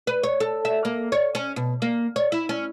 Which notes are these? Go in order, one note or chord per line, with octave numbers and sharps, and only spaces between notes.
B4
C#5
A4
E5
A#3
C#5
C#4
B2
A#3
C#5
E4
C#4